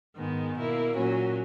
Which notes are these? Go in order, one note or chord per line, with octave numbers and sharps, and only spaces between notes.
G#2 D#3 G#3 B3
B2 A#3 E4
A#2 F#3 C#4 F#4